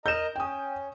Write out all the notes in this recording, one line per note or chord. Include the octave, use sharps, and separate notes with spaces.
A#4 D#5 A#5 G6 E7
C#4 G5 D#6